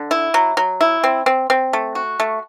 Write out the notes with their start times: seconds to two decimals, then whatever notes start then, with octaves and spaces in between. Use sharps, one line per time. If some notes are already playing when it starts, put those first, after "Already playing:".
Already playing: D3
0.11 E4
0.34 F#3
0.57 F#3
0.81 E4
1.04 C4
1.26 C4
1.50 C4
1.73 A3
1.95 F#4
2.20 A3